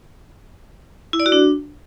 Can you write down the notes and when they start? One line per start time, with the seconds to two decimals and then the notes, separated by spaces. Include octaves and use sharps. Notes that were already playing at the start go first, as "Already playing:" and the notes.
1.13 E4
1.20 D5
1.26 F#4
1.32 D4